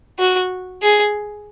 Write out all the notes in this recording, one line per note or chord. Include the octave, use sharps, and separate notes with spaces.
F#4
G#4